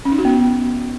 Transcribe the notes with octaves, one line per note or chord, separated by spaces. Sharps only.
C#4
D#4
F#4
B3